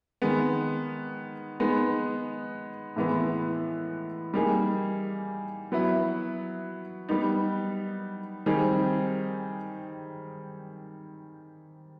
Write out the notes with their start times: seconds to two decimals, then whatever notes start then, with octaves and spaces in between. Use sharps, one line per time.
0.22 D#3 G#3 B3
1.60 G#3 B3 D#4
2.96 A2 E3 G#3 B3
4.34 G3 A#3 D#4 G#4
5.72 F#3 B3 E4
7.09 G3 B3 D#4
8.46 D#3 G3 C4 D#4 G#4